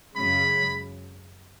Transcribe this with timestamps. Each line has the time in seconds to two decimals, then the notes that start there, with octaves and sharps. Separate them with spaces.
0.15 F#2 C#3 G#3 B5